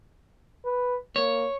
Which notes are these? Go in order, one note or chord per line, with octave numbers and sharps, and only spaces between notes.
B4
A#3 C#5